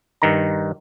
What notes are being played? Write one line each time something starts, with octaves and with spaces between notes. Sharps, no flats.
G2 D#3 A#5